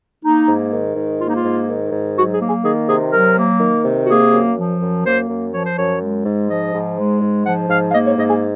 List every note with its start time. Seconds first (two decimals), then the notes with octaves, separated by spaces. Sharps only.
0.23 A#3 D#4
0.47 G#2
0.72 D#3
0.95 G#2
1.19 A#3 F4
1.27 D#4
1.35 F4
1.43 G#2
1.68 D#3
1.92 G#2
2.16 F#3 F#4
2.32 G#4
2.40 A#3
2.48 G#4
2.63 D#3 G#4
2.88 C3 G#4
3.11 F#3 A#4
3.36 A#3
3.60 D#3
3.84 C3
4.04 F#4
4.09 A#3 G#4
4.33 F#2
4.57 F3
4.81 F#2
5.04 A#3 C5
5.29 F#2
5.52 F3 C#5
5.64 C5
5.76 F#2 C#5
6.01 G#3
6.25 G#2
6.48 F3 D#5
6.74 G#2
6.97 G#3
7.21 G#2
7.45 F3 F#5
7.69 G#2 F5
7.89 F5
7.93 A#3 D#5
8.06 C#5
8.17 G#2 D#5
8.30 G#4